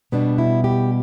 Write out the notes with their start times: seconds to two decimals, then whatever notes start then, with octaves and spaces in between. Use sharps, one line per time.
0.12 B2 G3 B3 D4
0.38 E4
0.64 G4